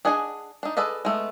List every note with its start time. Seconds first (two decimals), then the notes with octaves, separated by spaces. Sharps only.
0.05 D4 G#4 D#5 F#5 G#5
0.63 D4 D#4
0.77 G#4 A4 B4 D5 D#5
1.05 G#3 A3 B3